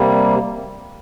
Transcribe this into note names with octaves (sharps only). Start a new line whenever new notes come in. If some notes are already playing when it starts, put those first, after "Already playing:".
Already playing: C3 G3 A#3